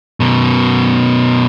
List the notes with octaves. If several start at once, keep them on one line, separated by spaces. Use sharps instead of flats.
F#2 B2